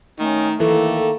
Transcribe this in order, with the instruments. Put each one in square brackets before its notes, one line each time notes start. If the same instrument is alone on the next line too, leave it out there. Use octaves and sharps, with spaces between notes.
[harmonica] D#3 [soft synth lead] A3 [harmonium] C#4 D#5
[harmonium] D#3 A#3 A#5 [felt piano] E3 [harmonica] A3 [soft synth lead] A4